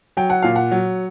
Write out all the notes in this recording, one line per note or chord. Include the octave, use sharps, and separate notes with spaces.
F#3 G5
F#5
A#2 F5
F#5
F#3